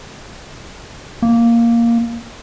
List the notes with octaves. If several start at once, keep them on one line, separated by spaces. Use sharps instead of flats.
A#3